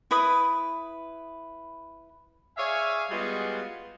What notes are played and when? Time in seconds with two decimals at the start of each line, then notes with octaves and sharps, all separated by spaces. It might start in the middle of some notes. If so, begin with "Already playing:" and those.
0.11 E4 B4 B5 D#6
2.58 G#4 C#5 D5 E5 F5 G#5
3.11 G3 G#3 B3 F4 F#4 G#4